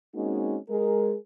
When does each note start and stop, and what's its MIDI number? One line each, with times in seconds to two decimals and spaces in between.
0.15 0.57 56
0.15 0.57 58
0.15 0.57 60
0.15 0.57 61
0.15 0.57 63
0.15 0.57 66
0.69 1.15 56
0.69 1.15 68
0.69 1.15 70